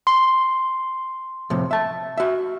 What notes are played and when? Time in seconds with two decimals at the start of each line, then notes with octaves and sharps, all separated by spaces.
0.07 C6
1.50 F2 A2 C3
1.71 E5 A5
2.18 F#4 E5